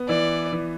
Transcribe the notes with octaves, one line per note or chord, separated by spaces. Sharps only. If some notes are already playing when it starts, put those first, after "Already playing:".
Already playing: B3
E3 D5
E3